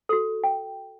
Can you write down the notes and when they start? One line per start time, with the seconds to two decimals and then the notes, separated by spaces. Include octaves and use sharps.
0.09 F#4 A4
0.44 G5